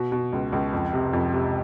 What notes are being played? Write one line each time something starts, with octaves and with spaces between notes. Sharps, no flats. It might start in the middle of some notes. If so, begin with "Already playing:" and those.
Already playing: B2
B2
C#2
C#2
F2
C3
F2
C3